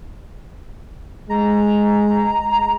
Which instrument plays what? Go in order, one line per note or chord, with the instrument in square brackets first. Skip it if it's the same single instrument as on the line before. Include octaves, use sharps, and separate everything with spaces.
[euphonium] G#3 [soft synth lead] A#5